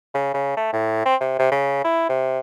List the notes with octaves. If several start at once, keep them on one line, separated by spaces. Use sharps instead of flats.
C#3
C#3
A3
A2
C4
C3
C3
C#3
E4
C3